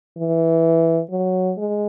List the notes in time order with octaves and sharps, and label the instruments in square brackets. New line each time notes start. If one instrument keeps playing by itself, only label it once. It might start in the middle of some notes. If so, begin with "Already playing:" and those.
[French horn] E3
F#3
G#3